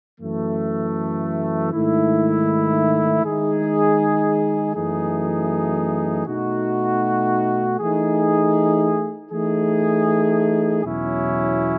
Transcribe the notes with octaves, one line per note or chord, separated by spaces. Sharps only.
F#2 E3 A3
G#2 D#3 A3 E4
D#3 G#3 D#4 G#4
F#2 E3 A3 D#4 G#4
B2 A3 D#4 F#4
E3 A3 D#4 G#4
E3 A3 D#4 G#4
E2 B2 F#3 C#4 E4